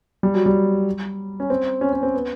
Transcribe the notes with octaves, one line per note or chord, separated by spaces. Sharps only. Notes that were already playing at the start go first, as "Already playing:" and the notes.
G3
F#3
G3
C#4
C4
C#4
C#4
C4
B3